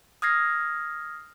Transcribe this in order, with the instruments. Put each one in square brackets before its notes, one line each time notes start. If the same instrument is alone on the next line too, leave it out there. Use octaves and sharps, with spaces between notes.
[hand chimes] D#6 F6 G#6 A#6 C7